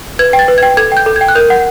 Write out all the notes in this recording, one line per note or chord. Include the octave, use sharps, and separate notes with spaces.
B4 G#6
G5
A6
B4
G5 G#6
A4 G#6
G5 G6
A4
G5 G#6
F#6
A#4 G6
F#5